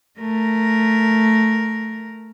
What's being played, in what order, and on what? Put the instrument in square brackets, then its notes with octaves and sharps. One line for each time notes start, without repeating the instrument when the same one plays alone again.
[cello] A3 A#4